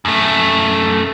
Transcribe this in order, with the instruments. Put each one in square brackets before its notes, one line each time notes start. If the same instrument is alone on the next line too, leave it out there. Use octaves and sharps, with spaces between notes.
[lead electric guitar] F#2 A3